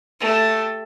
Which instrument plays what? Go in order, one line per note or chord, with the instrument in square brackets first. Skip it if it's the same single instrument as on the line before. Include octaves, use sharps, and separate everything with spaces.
[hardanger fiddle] A3 G4